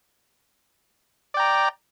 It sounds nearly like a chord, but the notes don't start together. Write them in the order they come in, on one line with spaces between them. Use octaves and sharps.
D5 G5 A#5